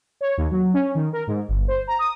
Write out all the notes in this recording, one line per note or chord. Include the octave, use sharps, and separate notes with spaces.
C#5
D#2
F#3
C#4
D#3
A#4
G#2
G1
C5
A#5
D#6